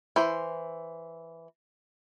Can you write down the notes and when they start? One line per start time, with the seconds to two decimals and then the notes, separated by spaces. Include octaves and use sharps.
0.16 E3 C5